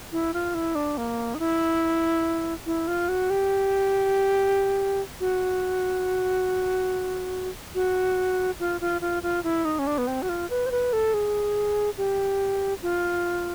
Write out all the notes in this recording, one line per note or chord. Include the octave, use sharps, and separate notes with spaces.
E4
F4
E4
D4
A#3
D#4
E4
E4
F4
F#4
G4
F#4
F#4
F4
F4
F4
F4
E4
D#4
C#4
D4
B3
C4
F#4
F4
B4
C5
B4
A4
G#4
G4
F4